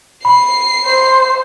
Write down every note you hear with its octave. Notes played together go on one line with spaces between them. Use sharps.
B5 C7
C5